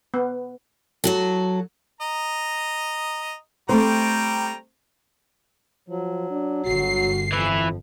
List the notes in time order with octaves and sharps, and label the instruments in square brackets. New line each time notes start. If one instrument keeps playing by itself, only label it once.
[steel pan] B3
[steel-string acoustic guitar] F#3 F#4 A4
[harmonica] D#5 A#5
[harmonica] G3 G5 A#5 [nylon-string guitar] A3 C4 C5
[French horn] F3 [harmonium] F#3
[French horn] D4
[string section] G1 C7 [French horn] F#4
[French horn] F2 [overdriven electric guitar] E3 E4 [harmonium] F3